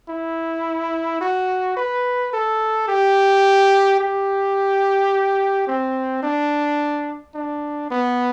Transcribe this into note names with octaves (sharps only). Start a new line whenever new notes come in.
E4
F#4
B4
A4
G4
G4
C4
D4
D4
B3